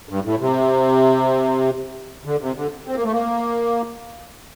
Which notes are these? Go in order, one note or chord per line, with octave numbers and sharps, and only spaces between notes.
G2
A2
C3
D3
C3
D3
C4
A#3
A3
A#3